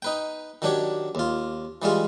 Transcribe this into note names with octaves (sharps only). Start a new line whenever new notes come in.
D#4 B4 G5
D#3 F#3 D4 G4 C#5
D#2 F4
E3 G3 G#3 F4